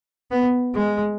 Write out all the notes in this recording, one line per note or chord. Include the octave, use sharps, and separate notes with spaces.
B3
G#3